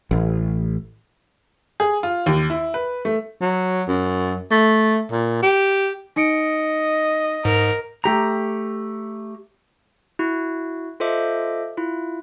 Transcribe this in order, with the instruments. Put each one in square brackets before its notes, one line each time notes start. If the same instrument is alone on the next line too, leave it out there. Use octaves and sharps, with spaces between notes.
[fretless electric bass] A1
[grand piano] G#4
F4
D#2
E4
B4
A3
[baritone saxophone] F#3
F#2
A3
A#2
G4
[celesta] D#4 C#7 D7 [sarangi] D#5
[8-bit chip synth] G#2 [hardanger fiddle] A#4
[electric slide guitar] A3 G4 A#5
[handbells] E4 F#4
F4 A4 C5 D#5 E5 D6
E4 F4